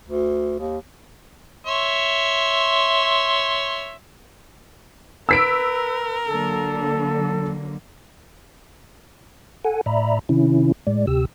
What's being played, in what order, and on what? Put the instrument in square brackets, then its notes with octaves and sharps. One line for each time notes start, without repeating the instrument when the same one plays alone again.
[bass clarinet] D2
D#2
[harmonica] C#5 E5 C6
[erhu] A#4 [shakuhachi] B4 [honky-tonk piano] E6 B6 D7
[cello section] D3 F#3 A#3 [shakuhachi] A4
[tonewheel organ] A4 F#5 G#5
A2 D5 E5 A#5 B5
C3 D#3 C#4 E4
A2 G#3 D5
D2 C3 G4 E6